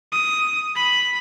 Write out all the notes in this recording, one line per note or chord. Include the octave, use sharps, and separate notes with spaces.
D#6
B5